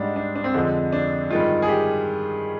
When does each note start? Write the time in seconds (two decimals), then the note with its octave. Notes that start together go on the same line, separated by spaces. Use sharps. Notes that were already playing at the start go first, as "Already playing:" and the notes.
Already playing: G#2 G3 D4
0.16 D4
0.35 D4
0.44 C4
0.54 F2 D3 G#3
0.92 D4
1.30 G2 D#3 G#3 F4
1.62 G#4
1.69 G4